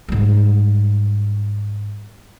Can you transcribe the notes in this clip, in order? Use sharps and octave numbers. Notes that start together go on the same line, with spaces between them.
G#2 G3